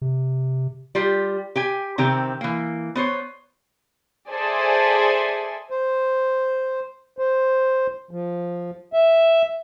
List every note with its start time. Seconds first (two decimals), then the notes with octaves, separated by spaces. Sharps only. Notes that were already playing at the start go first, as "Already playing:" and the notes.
0.01 C3
0.95 G3 F4 G4
1.56 G4 G5 G#5
1.98 C3 D#3 C4 G4
2.41 E3 A#3
2.95 B3 C5 C#5
4.30 G#4 A4 C5 D5 E5 G#5
5.70 C5
7.19 C5
8.11 F3
8.93 E5